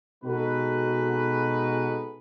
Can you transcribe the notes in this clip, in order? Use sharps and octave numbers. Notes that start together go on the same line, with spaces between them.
B2 G#3 D#4 F#4 A4 B4